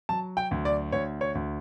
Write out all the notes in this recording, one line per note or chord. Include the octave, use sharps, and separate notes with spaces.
F#3 A5
G5
D2
D5
D2 C#5
C#5
D2